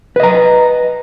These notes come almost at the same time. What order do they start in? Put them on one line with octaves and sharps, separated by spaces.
B4 D#5 A#5